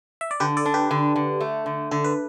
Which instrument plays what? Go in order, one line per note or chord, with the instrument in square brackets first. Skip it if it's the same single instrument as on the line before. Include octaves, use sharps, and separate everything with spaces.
[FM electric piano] E5
D5
[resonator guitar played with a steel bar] D3 [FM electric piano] G4 B4
[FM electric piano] A4 D5
[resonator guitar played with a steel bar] D4
[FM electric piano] G4 B4
[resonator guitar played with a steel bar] D3
D3
A3
D3
[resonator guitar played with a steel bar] D3 [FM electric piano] A4
[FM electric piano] B4